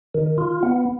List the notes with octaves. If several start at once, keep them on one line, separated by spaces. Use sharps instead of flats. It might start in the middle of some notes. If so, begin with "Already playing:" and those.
D#3
F4
B3